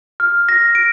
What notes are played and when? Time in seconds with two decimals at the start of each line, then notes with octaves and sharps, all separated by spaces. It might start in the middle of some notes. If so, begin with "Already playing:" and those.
0.20 F6
0.49 A#6
0.75 D7